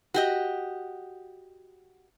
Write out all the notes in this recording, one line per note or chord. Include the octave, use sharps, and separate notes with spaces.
F#4 G4 D#5